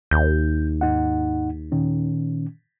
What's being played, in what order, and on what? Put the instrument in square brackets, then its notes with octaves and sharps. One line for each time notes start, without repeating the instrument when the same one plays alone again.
[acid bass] D#2 [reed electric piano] G6
[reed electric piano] G#2 D#4 F#5
A#2 D#3 C#4